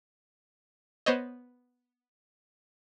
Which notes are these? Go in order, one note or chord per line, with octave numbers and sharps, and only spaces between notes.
B3 C5 C#5 D#5